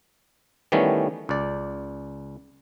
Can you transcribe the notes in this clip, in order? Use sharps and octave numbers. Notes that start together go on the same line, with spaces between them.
D#3 E3 G3 A3 B3 C#4
C#2 D5